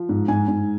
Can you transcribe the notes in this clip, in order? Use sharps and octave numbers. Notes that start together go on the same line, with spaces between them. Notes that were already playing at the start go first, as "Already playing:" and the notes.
Already playing: F3
G#2
G#2 G#5
G#2